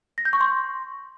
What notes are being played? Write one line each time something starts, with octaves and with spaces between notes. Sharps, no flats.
A#6
G6
C#6
C6